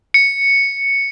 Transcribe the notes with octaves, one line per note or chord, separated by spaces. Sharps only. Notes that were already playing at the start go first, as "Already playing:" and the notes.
C#7